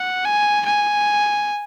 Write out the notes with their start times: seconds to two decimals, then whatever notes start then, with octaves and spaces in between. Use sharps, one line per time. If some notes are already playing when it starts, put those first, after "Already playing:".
Already playing: F#5
0.25 G#5
0.65 G#5